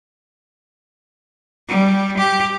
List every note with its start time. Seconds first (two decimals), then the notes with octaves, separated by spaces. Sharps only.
1.68 G3
2.18 G4